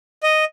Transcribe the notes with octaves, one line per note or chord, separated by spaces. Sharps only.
D#5